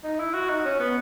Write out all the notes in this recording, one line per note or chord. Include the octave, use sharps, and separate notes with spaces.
D#4
E4
F#4
D#4
C#4
B3